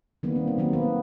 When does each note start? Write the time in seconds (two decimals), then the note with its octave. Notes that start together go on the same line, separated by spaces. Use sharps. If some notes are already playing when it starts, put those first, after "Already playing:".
0.23 D#3 G3 A#3 B3
0.36 C4
0.47 B3
0.58 D#3 F#3 A#3 C4
0.73 B3